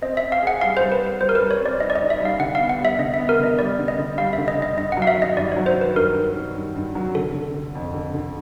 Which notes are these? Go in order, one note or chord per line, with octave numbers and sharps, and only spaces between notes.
C4 D#5
E5
C4
F5
G#4
F#5
G3 F5
C5
G3
B4
G3
B4
G3 C5
A#4
B4
G3
C#5
C4
D5
D#4 D#5
D5
D#5
D#4
E5
G3 F5
D3 F#5
F5
B3
F#5
G3 E5
D3 D#5
E5
B3
A#4
D3 D#5
G3 D5
D3
D#5
D3
G3 F5
E5
D3
D#5
D3 D#5
G2 D#5
F#5
F#3
F5
E5
D#3 D#5
G2 D5
C#5
F#3
C5
D#3 B4
G2 A#4
G2
D#3
G2
G2
F#3
D3 A4
D3
D3
F2
D3
D3